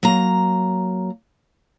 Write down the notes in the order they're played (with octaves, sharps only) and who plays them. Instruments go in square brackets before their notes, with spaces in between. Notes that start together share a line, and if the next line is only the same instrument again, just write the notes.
[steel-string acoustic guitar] F#3 A#3 A#5